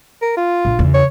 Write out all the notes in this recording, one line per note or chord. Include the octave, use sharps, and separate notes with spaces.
A#4
F4
A#1
E2 C#3
C#5